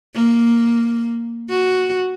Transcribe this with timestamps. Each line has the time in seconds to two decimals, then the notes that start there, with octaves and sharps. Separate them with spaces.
0.14 A#3
1.49 F#4